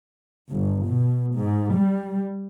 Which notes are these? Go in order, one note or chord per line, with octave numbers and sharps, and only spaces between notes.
G1
B2
G#2
G3